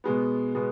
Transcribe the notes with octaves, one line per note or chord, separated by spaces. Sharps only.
B2 G#3 B3
B2 G#3 B3